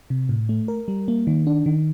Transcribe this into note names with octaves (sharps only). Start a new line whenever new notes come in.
C3
A2
A3
A#4
G3
A#3
D#3
D4
D#3